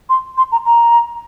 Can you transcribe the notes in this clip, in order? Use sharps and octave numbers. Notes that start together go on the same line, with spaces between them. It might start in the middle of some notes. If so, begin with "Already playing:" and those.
C6
C6
A#5
A#5